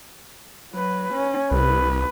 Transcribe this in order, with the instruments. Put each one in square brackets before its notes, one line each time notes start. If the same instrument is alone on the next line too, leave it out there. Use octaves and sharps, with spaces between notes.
[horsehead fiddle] F#3 B4
C#4
[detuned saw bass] C2 [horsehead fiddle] B4